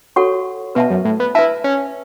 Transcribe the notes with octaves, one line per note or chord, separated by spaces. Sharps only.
F#4 A4 C#5 F#5 C#6
B2 B4 E5 A5
F#2
A2
B3
E4 B4 E5 A5
C#4